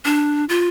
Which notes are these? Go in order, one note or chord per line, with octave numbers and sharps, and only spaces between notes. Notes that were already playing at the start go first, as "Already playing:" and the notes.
D4
F4